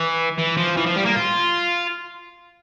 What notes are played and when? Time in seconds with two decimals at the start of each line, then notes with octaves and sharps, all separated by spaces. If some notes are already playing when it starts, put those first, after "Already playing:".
Already playing: E3
0.38 E3
0.57 F3
0.77 E3
0.86 F3
0.96 G3
1.05 A#3
1.15 F4